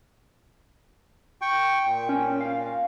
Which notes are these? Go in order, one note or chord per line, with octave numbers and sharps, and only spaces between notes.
G5 C#6
A#2 G5
C#4
F5